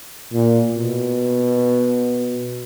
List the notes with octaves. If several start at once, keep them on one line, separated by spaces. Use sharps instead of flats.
A#2
B2